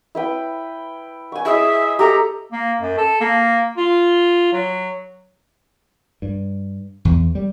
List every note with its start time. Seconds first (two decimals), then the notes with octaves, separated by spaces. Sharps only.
0.15 E4 B4 G5
1.32 G#5 C#6
1.45 E4 G#4 D#5 E5
1.99 G4 A4 A#5
2.52 A#3
2.82 F#2
2.98 A4
3.21 A#3
3.77 F4
4.53 F#3
6.22 G2
7.05 E2
7.35 G3